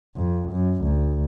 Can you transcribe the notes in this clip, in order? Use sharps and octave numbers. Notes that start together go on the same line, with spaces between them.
F2
F#2
D2